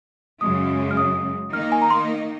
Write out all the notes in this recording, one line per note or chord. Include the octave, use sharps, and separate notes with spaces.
F#2 C#3 G#3 D#6
F6
D#6
D#3 A#3 D#4 F6
G#5
A#5
C6